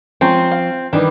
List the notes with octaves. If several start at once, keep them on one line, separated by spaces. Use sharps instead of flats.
F3 G#3 C4 C#4 A#5
F5
D#3 E3 G3 D4